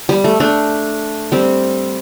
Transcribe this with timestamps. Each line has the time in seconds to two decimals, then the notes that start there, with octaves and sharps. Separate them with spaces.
0.09 G3
0.24 A3
0.40 A3 D4
1.32 G3 C4